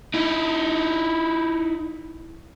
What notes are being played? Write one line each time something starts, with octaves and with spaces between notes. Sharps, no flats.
D#4 E4